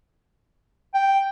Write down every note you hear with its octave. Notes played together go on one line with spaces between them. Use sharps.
G5